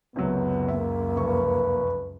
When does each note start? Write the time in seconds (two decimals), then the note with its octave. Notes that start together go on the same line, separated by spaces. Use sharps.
0.16 F#1 C#2 F#2 C3 F#3 B3
0.68 A#3 E5
1.16 F1 B4 C#6